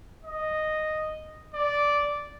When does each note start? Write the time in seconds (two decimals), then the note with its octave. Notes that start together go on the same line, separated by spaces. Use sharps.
0.24 D#5
1.54 D5